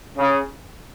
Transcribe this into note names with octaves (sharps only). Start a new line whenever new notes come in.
C#3